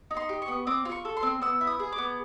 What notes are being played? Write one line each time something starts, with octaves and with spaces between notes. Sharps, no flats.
D#4
C6
G4
C#6
B3
C4 D6
F4
C#6
A4
C6
C4
B3 E6
E4
D#6
G#4
D6
B3